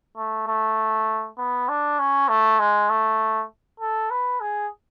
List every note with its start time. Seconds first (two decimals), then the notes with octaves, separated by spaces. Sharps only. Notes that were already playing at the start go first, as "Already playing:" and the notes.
0.17 A3
0.47 A3
1.38 B3
1.69 D4
1.99 C#4
2.29 A3
2.59 G#3
2.90 A3
3.80 A4
4.10 B4
4.40 G#4